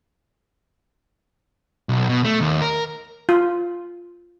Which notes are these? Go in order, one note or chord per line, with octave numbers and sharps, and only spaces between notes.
B1
B2
A3
D#2
A#4
F4